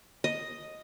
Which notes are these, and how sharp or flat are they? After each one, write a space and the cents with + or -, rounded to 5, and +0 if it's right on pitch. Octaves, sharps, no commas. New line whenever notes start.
D#5 +0